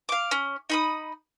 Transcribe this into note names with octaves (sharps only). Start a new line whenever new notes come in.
F5 D6
C#4
D#4 B5 D#6